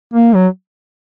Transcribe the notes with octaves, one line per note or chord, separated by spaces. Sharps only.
A#3
F#3